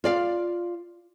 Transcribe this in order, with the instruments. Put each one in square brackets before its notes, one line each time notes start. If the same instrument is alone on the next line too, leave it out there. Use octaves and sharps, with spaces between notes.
[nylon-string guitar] F4 D5 F5